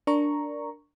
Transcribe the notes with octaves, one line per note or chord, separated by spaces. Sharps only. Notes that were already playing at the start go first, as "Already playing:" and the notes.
D4 A#4 A#5 C#6